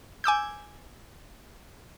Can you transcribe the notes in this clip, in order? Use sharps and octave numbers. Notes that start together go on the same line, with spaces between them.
G#5 D6 E6 G6